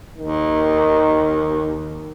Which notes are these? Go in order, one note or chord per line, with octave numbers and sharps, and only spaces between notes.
D#2 D#3